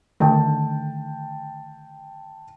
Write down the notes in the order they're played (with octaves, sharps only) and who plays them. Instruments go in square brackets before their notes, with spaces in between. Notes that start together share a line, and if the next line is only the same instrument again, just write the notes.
[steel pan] D3 D#3 A3 [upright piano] G5 A5